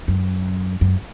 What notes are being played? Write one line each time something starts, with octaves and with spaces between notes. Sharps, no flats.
F#2
F#2